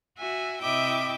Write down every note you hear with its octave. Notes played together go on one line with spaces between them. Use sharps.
F#4 E5 G#5
C3 E4 D#5 E5 G5 D6